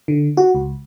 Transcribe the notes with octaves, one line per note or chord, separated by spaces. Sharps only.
D3
F#4
C#2